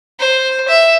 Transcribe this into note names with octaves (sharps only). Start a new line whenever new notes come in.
C5
E5